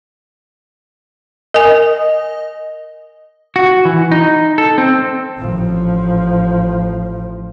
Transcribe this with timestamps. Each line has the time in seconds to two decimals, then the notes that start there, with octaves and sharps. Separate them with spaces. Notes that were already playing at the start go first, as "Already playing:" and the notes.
1.54 A#4 D#5 G#5
3.56 F#4
3.85 E3
4.12 D#4
4.58 A4
4.78 C4
5.39 A1 F3